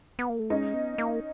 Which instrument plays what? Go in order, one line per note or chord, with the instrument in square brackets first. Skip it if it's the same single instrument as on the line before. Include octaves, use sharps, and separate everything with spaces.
[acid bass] B3
A#3
A3
[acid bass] G#3 [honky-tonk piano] C#4 D#4
[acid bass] B3
A#3